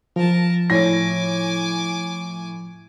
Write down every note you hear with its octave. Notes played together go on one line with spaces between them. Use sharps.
F3 A#4 A5
A2 G#5 D6 A#6